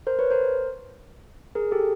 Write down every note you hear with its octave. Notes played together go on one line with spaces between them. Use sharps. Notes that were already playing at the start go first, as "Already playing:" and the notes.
A#4 C5
B4 C#5
A#4 C5
G#4 A#4
G4 A4